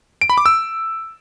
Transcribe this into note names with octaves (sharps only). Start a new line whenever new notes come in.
D7
B5
D6
E6